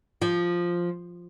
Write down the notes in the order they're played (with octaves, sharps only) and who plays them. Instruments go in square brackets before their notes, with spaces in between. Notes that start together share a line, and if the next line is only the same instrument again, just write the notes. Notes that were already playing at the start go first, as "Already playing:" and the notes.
[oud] F3